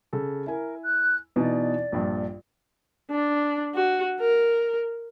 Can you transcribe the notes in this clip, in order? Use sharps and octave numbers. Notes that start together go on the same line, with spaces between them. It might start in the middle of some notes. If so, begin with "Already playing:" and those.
C#3 A4
E4 A#4 G#5
F#6
B2 E3 D#4 D5
A#1 G2
D4
F#4
A#4